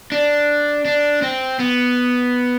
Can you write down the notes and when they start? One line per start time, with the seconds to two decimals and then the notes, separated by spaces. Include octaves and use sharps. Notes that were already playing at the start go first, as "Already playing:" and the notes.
0.12 D4
0.85 D4
1.22 C4
1.59 B3